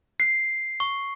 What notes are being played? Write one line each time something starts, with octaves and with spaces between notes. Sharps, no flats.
C7
C#6